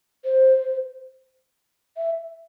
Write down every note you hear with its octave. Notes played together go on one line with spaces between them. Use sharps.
C5
E5